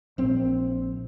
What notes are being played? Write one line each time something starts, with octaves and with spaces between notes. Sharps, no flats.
A#1 C4